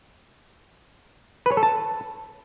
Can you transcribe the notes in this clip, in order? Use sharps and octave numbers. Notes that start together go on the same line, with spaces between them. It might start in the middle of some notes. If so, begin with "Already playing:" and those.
B4
C#5
A4
A5